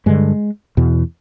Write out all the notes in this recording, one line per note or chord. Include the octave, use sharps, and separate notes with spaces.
G2 D3 G#3
E2 B2